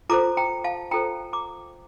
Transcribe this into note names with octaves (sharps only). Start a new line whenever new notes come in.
F4 A4 C5 A#5 D6
G5 A#5
F5 A5
F4 A4 C5 G5 A#5
A#5 D6